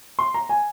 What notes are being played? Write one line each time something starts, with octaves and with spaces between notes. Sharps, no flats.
C6
A#5
G#5